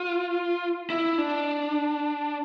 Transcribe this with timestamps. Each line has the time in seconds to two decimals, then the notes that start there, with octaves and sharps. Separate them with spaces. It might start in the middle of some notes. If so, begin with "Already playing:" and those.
Already playing: F4
0.90 E4
1.18 D4